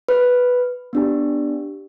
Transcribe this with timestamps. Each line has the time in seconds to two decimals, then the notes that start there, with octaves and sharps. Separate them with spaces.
0.09 B4
0.93 B3 D4 G4